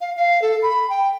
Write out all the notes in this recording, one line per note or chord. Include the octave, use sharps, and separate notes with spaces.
F5
F5
A4
B5
G5